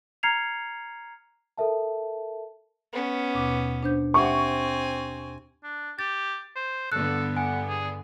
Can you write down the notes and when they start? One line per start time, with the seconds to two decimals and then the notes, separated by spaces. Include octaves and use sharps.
0.23 A#5 F6 G#6 C7 C#7 F7
1.58 A4 A#4 E5 A5
2.93 B3 C#4
3.34 D#2 B2 D6
3.83 D4 C5 G6
4.14 C4 G4 E5 F#5 G#5 C#6
5.63 D4
5.99 G4 A6
6.56 C5
6.92 G2 D3 B3 A4 F#6
7.37 F#5 G#5
7.69 G#4